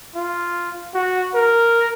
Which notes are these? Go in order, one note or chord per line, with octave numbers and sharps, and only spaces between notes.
F4
F#4
A#4